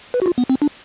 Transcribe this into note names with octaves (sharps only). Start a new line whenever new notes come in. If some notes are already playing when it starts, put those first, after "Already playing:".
B4
F#4
F4
B3
C4
D4